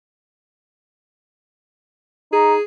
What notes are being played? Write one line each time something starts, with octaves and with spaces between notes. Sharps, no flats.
D#4 G#4